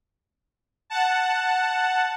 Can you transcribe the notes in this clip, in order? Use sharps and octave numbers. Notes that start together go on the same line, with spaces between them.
F#5 A5